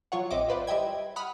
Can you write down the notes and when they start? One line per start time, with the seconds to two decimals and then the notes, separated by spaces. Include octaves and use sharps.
0.12 F#3 F4 C#5 F#5
0.31 A1 C4 D#5 E5 D6
0.48 F4 B4 C5 D5
0.67 G3 E4 D#5 G5 G#6
1.16 F#5 B5 D#6 F6